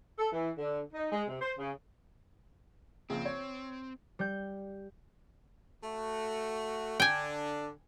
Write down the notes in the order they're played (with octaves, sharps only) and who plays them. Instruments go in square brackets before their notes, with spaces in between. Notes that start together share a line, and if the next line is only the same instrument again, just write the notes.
[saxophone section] A4
E3
D3
D#4
G#3
C3
C5
C#3
[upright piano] A#1 C#3 [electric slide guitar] C4
[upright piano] C#5
[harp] G3 G6
[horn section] A3 F#4
[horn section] D3 D4 [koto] G5 G#5